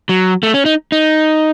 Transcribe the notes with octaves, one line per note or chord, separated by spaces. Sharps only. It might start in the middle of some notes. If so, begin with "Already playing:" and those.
F#3
A3
C#4
D#4
D#4